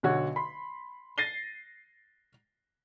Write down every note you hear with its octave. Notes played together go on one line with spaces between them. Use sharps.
B1 D3 F#4 C#5
B5 C6
A6 A#6 C7 D#7 G7